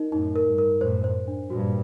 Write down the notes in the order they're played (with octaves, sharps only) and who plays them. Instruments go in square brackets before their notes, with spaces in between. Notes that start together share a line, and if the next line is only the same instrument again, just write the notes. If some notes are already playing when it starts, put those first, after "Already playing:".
Already playing: [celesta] D#4 A#4 D#5
[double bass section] F#2 A2 [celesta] D#4
[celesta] A#4
[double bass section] G2
[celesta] A#4
[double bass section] F#2 A2 [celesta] C5
[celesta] C5
D4
[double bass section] G2 A#2 [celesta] F#4